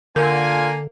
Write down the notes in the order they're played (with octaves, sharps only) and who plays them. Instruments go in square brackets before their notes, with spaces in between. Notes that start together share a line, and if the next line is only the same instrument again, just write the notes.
[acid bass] D3 [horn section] A#3 D4 G#5 [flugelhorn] F4 [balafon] A#4